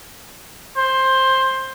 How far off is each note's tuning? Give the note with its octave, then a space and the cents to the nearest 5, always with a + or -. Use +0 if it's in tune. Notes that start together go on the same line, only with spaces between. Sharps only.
C5 +15